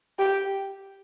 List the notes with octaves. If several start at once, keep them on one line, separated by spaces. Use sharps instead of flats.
G4